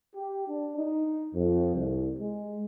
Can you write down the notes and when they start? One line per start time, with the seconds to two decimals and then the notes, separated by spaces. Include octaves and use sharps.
0.15 G4
0.48 D4
0.77 D#4
1.35 F2
1.75 C2
2.19 G#3